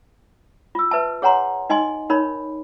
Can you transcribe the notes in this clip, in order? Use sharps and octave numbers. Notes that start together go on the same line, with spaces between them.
F4 E6
B4 E5 A5
G#4 C#5 F#5 G#5 A#5 C6
D#4 D#5 G#5 C6
D#4 A#4 C#5 B5